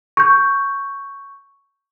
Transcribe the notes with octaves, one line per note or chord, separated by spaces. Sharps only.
C#6 G6